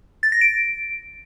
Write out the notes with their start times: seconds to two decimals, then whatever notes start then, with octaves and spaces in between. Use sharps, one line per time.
0.23 A6
0.32 A#6
0.41 D7